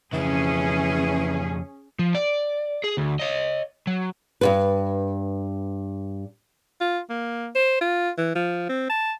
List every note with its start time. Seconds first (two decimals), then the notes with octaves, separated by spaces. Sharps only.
0.13 F2 C#3 E3 C#4 G#4
1.99 F3
2.15 D5
2.84 G#4
2.98 D2
3.20 C#5 D#5
3.87 F#3
4.41 G2 A#2 B4
6.81 F4
7.09 A#3
7.55 C5
7.81 F4
8.18 E3
8.35 F3
8.69 C4
8.89 A5